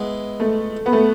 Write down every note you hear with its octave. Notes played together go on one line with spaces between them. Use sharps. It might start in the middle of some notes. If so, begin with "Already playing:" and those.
Already playing: G#3 B3 E4
A3
B3
A3